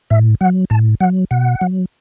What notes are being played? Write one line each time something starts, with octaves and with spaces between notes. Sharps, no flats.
A2 E5
F#3 F#5
A2 A5
F#3 F#5
B2 F#5
F#3